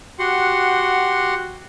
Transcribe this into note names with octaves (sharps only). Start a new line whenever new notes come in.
F#4 G4 F#5 C6